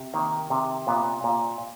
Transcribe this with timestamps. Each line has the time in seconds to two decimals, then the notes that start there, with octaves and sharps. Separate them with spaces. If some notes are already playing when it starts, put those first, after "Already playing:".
Already playing: C3
0.14 D#3 A#3
0.50 C3
0.87 A#2 B3
1.24 A#2